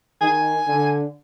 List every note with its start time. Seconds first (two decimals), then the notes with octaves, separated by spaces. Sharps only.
0.21 D#3 G#5
0.68 D3